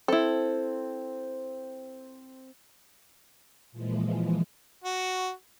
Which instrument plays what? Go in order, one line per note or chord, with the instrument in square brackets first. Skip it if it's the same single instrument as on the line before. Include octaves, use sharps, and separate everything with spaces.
[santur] C4 [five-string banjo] E4 A4
[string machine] A#2 E3 F3 G#3
[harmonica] F#4